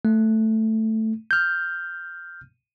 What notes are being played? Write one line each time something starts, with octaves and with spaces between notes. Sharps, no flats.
A3
F6 G6